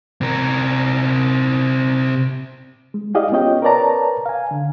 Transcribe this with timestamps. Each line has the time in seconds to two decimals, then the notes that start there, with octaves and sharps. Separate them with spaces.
0.21 C3 A#4
2.94 G#3
3.15 E4 G4 G#4 D5 D#5 F5
3.32 B3 C#4 F4 C#5 D#5 G5
3.62 A#4 B4 C#5 D5 A5 A#5
4.26 F5 G#5
4.51 D3